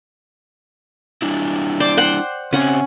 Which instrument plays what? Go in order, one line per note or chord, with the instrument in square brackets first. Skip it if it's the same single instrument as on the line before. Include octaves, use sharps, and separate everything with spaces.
[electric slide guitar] G3 D4 E4
[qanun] C5 D5 D6
C5 F#5 G5
[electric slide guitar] C#3 C4 [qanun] C#4 F#5